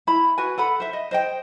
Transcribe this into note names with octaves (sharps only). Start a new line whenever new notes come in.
E4 B5
F#4 B4 G#5
A4 F#5 B5
C5 E5
D#5
C5 D#5 G5